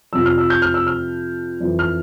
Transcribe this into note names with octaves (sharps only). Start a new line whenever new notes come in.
F2 C3 F3 E6
F6
E6
G6
F6
E6
F6
F2 E3
F6